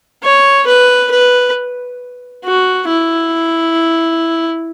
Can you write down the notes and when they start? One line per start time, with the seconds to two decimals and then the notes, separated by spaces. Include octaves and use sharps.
0.22 C#5
0.67 B4
1.11 B4
2.44 F#4
2.88 E4